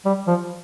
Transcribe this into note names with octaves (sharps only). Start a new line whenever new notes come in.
G3
F3